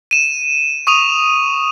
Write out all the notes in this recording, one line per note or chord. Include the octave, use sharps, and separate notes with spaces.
D#7 E7
C#6 D#6 D#7 F7